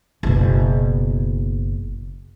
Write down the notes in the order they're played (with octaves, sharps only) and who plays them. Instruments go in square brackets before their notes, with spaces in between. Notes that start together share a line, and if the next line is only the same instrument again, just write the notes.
[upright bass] F#1 B2